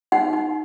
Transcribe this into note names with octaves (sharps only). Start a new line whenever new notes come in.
D#4 F#5
D#4